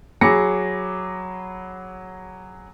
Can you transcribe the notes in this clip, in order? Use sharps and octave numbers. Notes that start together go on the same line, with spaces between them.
F#3 G#4 B5 D6 A#6 C#7